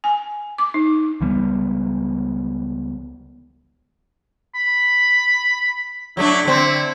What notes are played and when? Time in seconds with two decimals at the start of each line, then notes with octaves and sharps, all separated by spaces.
0.04 G#5
0.58 D6
0.74 D#4
1.21 C#2 E3 G3 B3
4.55 B5
6.17 F#3 A3 D4 E4
6.45 D3 C4